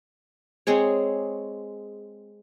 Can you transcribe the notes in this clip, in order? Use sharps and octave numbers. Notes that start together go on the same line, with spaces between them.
G#3 C4 G#4 C#5